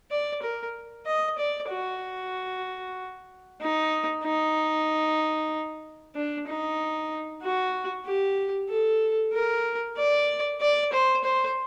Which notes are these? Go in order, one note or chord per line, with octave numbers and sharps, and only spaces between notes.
D5
A#4
D#5
D5
F#4
D#4
D#4
D4
D#4
F#4
G4
A4
A#4
D5
D5
C5
C5